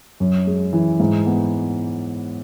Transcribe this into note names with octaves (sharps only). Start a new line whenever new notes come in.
F#2
G#3
E3
G#2
B3